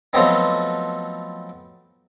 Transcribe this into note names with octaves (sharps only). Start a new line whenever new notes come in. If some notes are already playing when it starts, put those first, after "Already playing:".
F3 F#3 A3 B3 C4 D#4